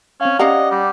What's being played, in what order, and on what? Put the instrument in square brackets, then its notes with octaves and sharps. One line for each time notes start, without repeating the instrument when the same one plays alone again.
[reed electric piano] C4 F5 [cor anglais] C#4
[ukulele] C#4 F5 A#5 [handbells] G4 F#5 [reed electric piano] D5 [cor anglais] D#5
[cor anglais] G3